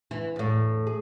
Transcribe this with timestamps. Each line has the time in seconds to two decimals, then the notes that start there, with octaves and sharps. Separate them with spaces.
0.11 E3
0.36 E2 A2
0.87 G#4